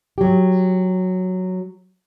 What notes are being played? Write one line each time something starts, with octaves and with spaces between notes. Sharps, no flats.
F#3 G4